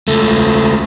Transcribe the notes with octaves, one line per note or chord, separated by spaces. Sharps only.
C#2 A3